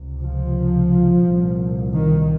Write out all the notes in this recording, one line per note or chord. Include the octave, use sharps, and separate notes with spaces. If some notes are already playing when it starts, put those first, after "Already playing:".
Already playing: C#2 C3
F3
C2 A#2
D#3